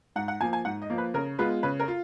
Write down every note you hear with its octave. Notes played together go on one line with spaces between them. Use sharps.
G#2 F#5
F#5
F3 A#3 G#5
G#5
G#2 F#5
D#5
F3 A#3
B4
C#3 A#4
G#3 B3 F4 B4
C#3 B4
A#4
F4